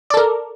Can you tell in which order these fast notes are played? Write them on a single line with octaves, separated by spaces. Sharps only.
D5 A4 A#4